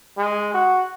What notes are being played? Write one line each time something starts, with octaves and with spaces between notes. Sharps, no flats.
G#3
F#4